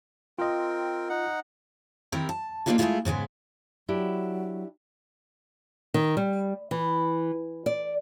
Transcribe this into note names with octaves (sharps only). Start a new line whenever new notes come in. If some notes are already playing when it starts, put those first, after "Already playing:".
C4 F4 A#4 D#5 G5
D#4 F#5
D#3 C4 E4 G4 A#4
A5
A#3 B3 D4 D#4 F4 A4
G#3 A3 C#4 E4 F4 G#4
G#2 C#3 G#3 B3
F#3 D4 E4 G4
D#3
G3
E3
D5